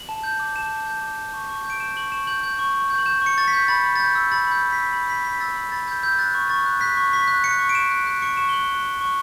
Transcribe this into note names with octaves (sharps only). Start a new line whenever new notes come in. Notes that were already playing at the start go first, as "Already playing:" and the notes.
Already playing: F#7
A5
G6
D6
A5 E7
A5
G6
D6
G6
C#6
C#6
G6
D7
G6 E7
C#6 F#7
C#6 E7
G6 F#7
G6
C#6
C#6
G6
F#7
G6 E7
C#6 C#7
C#6 A6
B6
G6
B5 A6
B5
A6
G6
E6
B5 A6
B5 G6
G6
B6
E6
B5
B5 B6
G6 B6
E6 A6
B5
B5 A6
G6 A6
E6 G6
F#6 A6
C#6
C#6 A6
F#6
F#6 B6
C#6
C#6 B6
F#6
F#6 C#7
C#6
D7
C#6 E7
F#6
F#6
C#6 C#7
C#6 E7
G7
F#6 F#7
F#6
C#6
C#6